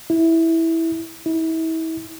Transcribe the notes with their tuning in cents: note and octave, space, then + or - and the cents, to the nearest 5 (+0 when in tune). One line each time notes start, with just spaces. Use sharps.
E4 -10
E4 -35